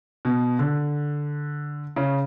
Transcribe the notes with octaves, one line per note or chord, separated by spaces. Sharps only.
B2
D3
C#3